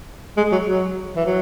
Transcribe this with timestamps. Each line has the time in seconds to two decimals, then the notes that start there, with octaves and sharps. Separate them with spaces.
0.37 G#3
0.52 F#3
0.67 F#3
1.16 E3
1.26 F#3